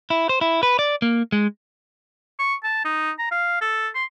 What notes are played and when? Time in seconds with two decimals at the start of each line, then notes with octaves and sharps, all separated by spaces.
0.10 E4
0.29 C5
0.41 E4
0.63 B4
0.79 D5
1.02 A#3
1.32 G#3
2.39 C#6
2.63 A5
2.85 D#4
3.19 A#5
3.31 F5
3.61 A4
3.95 C6